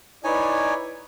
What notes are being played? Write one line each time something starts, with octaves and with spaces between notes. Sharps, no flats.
D#4 E4 B4 C#5 D5 G#5